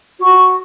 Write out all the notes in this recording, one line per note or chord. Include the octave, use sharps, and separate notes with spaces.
F#4